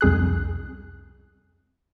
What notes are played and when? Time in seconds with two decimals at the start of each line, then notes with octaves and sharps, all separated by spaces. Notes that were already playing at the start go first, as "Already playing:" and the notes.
0.01 C2 F2 G#4 F#6